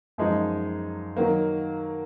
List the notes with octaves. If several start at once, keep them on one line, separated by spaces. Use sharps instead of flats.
F#2 F3 G#3 D#4
D#3 F#3 A#3